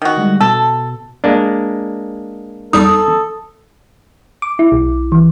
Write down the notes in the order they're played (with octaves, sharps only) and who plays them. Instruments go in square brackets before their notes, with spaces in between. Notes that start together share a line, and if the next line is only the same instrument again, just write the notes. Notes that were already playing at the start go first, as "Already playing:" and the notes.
[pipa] D#3 F#4
[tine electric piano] D3 G3 G#3
[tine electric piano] B2 [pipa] A4
[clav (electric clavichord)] G#3 A#3 D4
[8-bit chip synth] E2 G3 D#4 [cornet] A4 [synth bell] D#6
[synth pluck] D6
E4
B1
E3